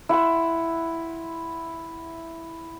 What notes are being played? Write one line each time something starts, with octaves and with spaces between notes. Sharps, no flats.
E4 F#5 C6 E6